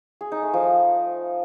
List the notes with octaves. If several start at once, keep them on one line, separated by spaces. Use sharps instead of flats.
G#4
D#4
A3
F3